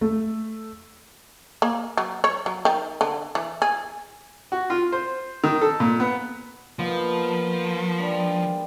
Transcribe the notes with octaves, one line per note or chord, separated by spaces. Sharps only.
A3
A#3
F#3
C#5
F#3
D#3
D3
E3
G#4
F#4
F4
C5
D#3
A4
A#2
B3
F3 A#3 B3 D#4
G3 G#3 D4